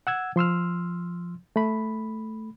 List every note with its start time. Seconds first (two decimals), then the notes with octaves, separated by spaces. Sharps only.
0.07 F#5 E6 G#6
0.36 F3 C6 E6 F6
1.56 A3 B5